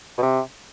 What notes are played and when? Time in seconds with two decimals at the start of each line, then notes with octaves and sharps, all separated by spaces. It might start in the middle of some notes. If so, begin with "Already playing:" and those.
0.18 B2
0.22 C3